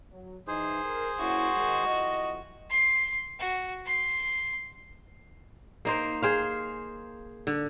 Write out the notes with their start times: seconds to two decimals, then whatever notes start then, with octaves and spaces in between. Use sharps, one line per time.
0.13 F#3
0.47 E3 D#4 G#4 C5
0.85 A#4
1.20 A#3 C#4 E4 F#4
1.57 D#3 G#3
1.86 F2 E4 D#5
2.70 C6
3.40 F#4
3.86 C6
5.85 A#3 D#4 C5
6.22 G#4 C5 F5
7.47 D3